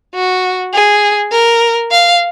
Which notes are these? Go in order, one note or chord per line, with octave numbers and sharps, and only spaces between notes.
F#4
G#4
A#4
F5